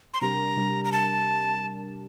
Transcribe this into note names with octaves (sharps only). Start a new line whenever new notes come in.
C6
C3 G3 D4 G4 A#4 A#5
C3 G3 D4 G4 A#4
A#5
C3 A5